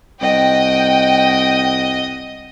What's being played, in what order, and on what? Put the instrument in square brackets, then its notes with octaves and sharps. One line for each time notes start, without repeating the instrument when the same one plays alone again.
[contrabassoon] C2 [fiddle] D#5 F#5 [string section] G5